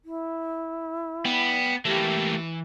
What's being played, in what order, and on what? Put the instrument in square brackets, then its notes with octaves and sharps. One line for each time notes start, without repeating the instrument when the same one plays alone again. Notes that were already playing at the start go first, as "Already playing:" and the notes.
[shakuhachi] E4
[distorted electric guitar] B3 [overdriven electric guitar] G5 B5
[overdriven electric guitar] E3 [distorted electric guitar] A3 A#3 [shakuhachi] G4